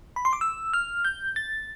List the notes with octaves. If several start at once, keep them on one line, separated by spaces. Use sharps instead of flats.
B5
C6
D6
E6
F6
G6
A6